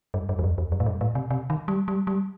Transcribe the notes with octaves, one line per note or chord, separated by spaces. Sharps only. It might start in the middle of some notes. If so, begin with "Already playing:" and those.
G2
G2
E2
F#2
E2
F#2
A2
G2
A2
C3
C3
D#3
G3
G3
G3